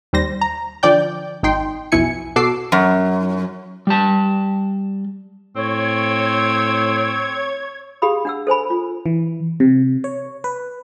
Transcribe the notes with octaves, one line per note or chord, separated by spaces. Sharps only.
D#2 G3 C5 A#6
A#5
D3 F3 D5 G5 G6
G#1 D#4 G5 C6
B1 F2 B2 E4 G#5 C#7
B2 F#4 A4 D6 E6 C7
F#2
G3 A5
A2 C4 C#5 G#6
G4 G#4 F5 B5 D#6
D4 F#5 E6
A4 C5 G#5 B5
F4
E3
C3
C#5
B4